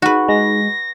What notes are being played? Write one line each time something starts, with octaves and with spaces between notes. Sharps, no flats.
D#4 F#4 G#4 B4
G#3 A#6